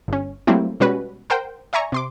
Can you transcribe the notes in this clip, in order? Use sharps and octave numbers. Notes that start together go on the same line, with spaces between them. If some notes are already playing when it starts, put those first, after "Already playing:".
G1 C#4
F#3 G3 A3 A#3 C4 E4
B2 G3 G#3 C#4 F#4 B4
A#4 C5 F#5 G5
D5 E5 G#5 A#5 C#6
C3 C6 D6